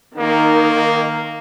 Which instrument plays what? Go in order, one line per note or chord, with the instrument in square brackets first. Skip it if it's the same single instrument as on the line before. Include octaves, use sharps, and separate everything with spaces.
[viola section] D#3 [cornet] A#3